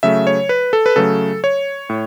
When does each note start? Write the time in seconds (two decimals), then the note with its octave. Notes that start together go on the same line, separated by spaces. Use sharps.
0.03 C#3 F#3 A3 E5
0.27 C#5
0.49 B4
0.73 A4
0.86 B4
0.96 C#3 F#3 A3 A4
1.44 C#5
1.89 A2